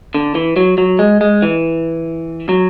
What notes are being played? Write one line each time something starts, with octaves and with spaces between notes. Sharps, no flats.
D3
E3
F#3
F#3
G#3
G#3
E3
F#3